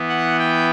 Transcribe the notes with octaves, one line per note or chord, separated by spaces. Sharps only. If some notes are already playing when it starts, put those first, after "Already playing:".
Already playing: E3 B3
F#5
G5